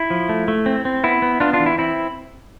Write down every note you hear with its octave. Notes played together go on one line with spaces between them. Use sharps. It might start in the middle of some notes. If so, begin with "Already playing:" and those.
Already playing: E4
F3
A3
A3
C4
C4
B3 E4
B3
B3 D4 F4
D4 F4
E3
E4
C4 E4